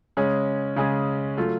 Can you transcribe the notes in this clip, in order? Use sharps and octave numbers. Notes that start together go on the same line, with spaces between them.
C#3 G#3 C#4 G#4
C#3 G#3 C#4 G#4
F#3 A3 F4